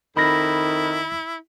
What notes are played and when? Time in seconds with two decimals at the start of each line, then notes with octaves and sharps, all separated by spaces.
0.17 F2 D#3 E4 B5 A#6